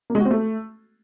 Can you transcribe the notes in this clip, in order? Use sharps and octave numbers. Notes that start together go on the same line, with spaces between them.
A#3
G#3
F#4
C4
A3